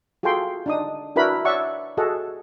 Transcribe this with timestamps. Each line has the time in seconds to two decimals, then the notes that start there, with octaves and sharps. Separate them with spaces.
0.23 F4 F#4 G#4 A4 G5 C6
0.66 D4 D#4 D#6
1.16 D4 E4 F#4 A#4 B4 B5
1.45 C#5 D5 E5 F#5 C#6
1.97 F#4 G#4 A4 D#5 F#5